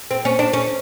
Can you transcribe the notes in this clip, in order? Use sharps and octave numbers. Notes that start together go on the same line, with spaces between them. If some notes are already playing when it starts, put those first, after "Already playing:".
C4
C#4
D4
C#4